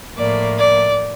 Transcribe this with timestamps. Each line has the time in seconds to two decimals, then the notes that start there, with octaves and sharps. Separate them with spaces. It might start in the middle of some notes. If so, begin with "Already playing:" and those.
0.17 A2 F3 A#3 D5
0.57 D5